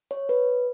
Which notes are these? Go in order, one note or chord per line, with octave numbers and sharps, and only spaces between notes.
C#5
B4